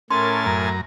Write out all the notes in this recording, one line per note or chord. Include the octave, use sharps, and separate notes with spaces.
A2 C#4 A#4 G#5 A5 C6 A6
F#2 A#5